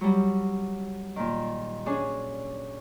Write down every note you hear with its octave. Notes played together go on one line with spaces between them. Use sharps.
F#3 G3
A#2 D#3
C#4 D4 G#4